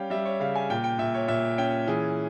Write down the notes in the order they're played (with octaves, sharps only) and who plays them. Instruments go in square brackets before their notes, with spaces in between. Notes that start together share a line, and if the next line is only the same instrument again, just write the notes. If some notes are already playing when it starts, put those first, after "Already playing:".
Already playing: [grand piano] G3 C#4 F5 G5
G3 E5
C#5
C#3 F5
G#5
A#2 G5
G5
A#2 E5
C#5
A#2 E5
C#4 G5
E3 G#4